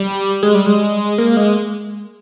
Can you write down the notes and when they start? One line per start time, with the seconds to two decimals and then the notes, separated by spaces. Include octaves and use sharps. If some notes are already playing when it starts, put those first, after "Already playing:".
Already playing: G3
0.43 G#3
0.55 G3
0.67 G#3
1.18 A#3
1.37 G#3